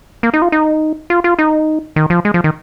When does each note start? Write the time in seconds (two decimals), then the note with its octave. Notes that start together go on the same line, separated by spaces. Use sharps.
0.23 A#3
0.33 D#4
0.42 F4
0.52 D#4
1.10 F4
1.24 F4
1.39 D#4
1.96 D#3
2.10 F3
2.25 G#3
2.34 F3
2.44 D#3